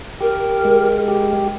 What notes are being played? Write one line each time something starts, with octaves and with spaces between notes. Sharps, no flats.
G4 A#4
G#3
G4